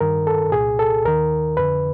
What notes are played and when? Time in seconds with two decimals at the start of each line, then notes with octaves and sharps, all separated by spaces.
0.01 G2 D#3 A#4
0.27 A4
0.52 C2 A#2 G#4
0.79 A4
1.05 D#2 D#3 A#4
1.57 F2 D3 B4